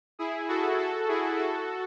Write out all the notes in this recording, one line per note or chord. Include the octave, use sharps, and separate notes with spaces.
E4 G#4
F#4 A4
F#4 A4
E4 G#4
F#4 A4